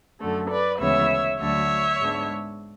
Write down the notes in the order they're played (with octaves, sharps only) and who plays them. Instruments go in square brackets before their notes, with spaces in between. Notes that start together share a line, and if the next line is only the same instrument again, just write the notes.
[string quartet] F#2 D3 A3
B4 D5
D2 C#3 E3 G#3 B3 C#5 E5
D2 D3 F#3 A3 D4 C#5 E5
G#2 G#3 B3 D4